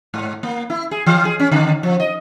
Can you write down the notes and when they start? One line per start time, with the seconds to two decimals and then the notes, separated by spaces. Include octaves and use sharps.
0.14 G#2
0.43 A#3
0.70 E4
0.91 G#4
1.06 E3
1.25 G#4
1.40 C#4
1.52 D3
1.83 F3
2.00 D#5